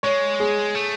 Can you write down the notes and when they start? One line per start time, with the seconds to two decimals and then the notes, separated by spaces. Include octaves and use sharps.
0.03 G#3 C#5
0.40 G#4
0.75 A3